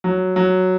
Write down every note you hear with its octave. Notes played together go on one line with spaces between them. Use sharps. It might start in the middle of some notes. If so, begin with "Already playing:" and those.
F#3
F#3